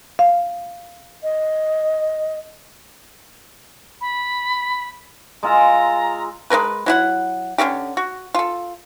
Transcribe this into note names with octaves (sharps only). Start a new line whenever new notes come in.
F5
D#5
B5
G#3 F4 E5 A#5
G#3 C#4 A#4 B4
F#3 E4 F#5
D3 C#4 F#4 G4
F#4
F4 A4